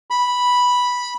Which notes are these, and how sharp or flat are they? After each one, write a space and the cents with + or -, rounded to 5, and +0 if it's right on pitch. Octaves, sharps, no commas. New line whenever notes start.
B5 -5